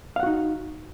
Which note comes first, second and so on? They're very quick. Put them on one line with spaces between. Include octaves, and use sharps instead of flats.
F5 F#5 F#4 D#4